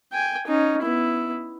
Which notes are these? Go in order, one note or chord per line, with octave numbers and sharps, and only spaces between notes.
G5 G#5
C#4 D#4
B3 E4